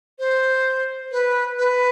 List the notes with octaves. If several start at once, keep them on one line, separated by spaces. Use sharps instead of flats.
C5
B4
B4